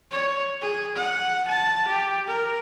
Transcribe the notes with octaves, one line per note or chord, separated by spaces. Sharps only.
C#5
G#4
F#5
A5
G4
A#4